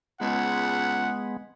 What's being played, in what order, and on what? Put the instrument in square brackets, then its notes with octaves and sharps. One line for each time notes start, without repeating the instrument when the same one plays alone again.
[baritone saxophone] C#2 [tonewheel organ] G#3 B3 [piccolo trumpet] F#5